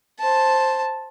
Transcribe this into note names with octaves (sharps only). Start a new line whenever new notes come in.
C5 A5